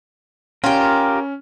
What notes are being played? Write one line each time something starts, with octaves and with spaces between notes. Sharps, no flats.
C#4 F4 G4 A#4